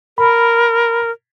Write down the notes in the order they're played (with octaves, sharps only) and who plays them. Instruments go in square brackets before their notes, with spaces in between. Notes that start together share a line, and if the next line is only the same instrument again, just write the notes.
[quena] A#4 [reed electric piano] B5